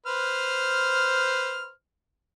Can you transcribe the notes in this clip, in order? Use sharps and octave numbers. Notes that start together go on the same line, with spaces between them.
B4 C5 F6